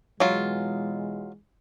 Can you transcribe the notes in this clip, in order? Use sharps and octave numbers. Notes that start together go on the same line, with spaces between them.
B2 E3 F#3 G#3 F4